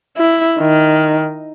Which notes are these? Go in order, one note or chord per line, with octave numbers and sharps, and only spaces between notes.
E4
D#3